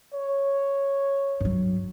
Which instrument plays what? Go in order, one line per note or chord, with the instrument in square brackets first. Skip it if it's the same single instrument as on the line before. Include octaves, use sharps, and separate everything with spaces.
[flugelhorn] C#5
[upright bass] G2 F#3